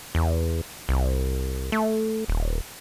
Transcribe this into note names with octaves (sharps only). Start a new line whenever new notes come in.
E2
C2
A3
D#1